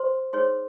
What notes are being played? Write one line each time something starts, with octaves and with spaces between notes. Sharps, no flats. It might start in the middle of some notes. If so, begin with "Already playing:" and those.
Already playing: C5 C6
D#4 G#4 C5 C#5 C6